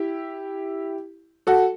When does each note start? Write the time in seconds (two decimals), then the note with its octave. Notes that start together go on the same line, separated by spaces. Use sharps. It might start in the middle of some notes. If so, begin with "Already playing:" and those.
Already playing: E4 G4
1.47 F#4 A4